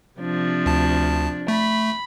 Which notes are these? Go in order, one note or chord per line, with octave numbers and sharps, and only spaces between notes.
C3 F3 D4
D2 A5
A3 B5